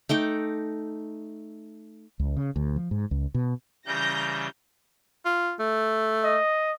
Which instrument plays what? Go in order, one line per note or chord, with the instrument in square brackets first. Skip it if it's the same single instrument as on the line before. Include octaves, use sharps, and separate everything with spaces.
[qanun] A3 D#4 G5 D6
[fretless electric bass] C#2
C#3
D2
F3
G#2
C#2
B2
[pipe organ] C#3 E3 G3 [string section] A#5 G6 A#6
[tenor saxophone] F4
A3
[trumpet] D#5